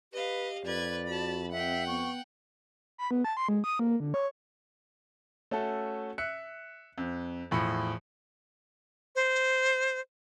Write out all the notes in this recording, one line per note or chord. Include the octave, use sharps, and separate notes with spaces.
G4 B4 D#5 F5
F2 B4 D5 G#6
F#4 A5 B5
C4 E5 F#5 G5
B3 C#6
B5
B3
A5
C6
G#3
D#6
A#3
D3
C#5
A3 C#4 F#4 A4
E5 F#6 C#7
F2
E2 A2 F3 B5 C#7
C5